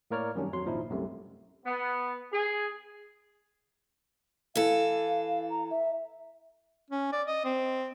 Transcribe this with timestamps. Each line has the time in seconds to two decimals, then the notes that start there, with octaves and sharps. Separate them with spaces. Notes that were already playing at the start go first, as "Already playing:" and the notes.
0.11 A2 A#3 A#4 C#5 D5 F6
0.35 F#2 D#3 G3 C#4 D4
0.52 F2 F#3 C6
0.65 G#1 A#2 F3 D#4 E4
0.90 C2 F#2 C3 A3
1.66 B3
2.33 G#4
4.55 E3 A4 F5
5.50 A#5
5.70 E5
6.90 C#4
7.13 D5
7.28 D#5
7.45 C4